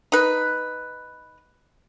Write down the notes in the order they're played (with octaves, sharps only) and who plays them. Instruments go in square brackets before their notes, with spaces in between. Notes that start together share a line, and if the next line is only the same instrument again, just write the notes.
[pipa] D#4 B4